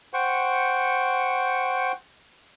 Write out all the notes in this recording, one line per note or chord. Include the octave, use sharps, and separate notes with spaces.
C5 F#5 G5 C#6